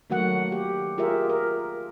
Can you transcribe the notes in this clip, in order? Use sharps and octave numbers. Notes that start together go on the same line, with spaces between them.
D#3 F#3 A3 A#3 F#4 F#5
G4
F4 G4 G#4 A#4 E5
A#4